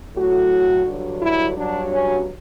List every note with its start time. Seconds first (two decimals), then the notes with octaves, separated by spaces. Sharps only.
0.16 A2 F#3 F#4
0.85 G2 D3 F#3
1.21 E4
1.56 G2 F#3 D4
1.91 C#4